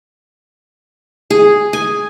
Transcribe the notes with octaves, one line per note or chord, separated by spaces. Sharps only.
G#4
G#5